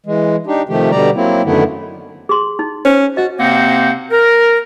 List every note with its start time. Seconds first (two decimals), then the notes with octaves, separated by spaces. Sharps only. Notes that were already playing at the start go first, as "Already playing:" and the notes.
0.06 E3 G#3
0.47 D4 D#4 G4
0.69 C3 D#3 F3 A3 G4
0.91 B2 D3 G3 G4 D5 A#5
1.16 F#3 A#3 C4 E4
1.44 F#2 D3 D#3 A3 B3 E4
2.29 G#4 C6
2.59 D#4
2.85 C#4 C5
3.17 F#4 D#5
3.40 C3 A#3 C4 D#4 C5 F#5
4.11 A#4